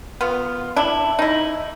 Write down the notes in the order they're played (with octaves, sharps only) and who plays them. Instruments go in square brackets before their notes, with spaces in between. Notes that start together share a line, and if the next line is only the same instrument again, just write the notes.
[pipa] B3 F4
D4 E4
D#4 E4